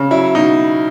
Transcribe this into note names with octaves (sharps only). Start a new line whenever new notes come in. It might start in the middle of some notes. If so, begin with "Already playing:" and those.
Already playing: C#3
F#3 E4
B2 D#4